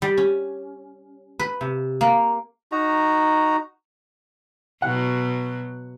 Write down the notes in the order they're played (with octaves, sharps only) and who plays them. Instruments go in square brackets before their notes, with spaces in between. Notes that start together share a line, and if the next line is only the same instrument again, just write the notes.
[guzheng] G3
C#4
B4
C3
A#3
[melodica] D#4 F#4 A#5
[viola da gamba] B2 F#3 [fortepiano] F#5